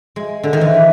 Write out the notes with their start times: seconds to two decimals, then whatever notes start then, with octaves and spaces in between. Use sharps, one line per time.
0.16 G#3
0.43 D3
0.53 D#3
0.61 E3